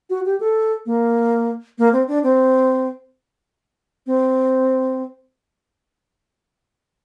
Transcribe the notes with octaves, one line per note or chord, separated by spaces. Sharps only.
F#4
G4
A4
A#3
A#3
C4
D4
C4
C4